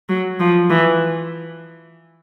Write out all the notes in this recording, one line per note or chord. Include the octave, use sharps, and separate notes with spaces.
F#3
F3
E3